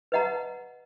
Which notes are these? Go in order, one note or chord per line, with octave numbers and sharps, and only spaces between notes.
B4 D#5 F#5 A#5